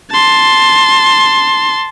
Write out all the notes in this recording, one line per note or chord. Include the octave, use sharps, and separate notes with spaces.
A5 C6